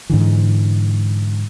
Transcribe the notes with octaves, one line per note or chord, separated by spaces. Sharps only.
G#2 D3 E3